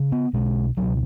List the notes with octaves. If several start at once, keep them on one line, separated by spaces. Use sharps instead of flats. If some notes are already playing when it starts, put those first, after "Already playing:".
Already playing: C#3
B3
B1 B2 G#3
C#2 B2 F#3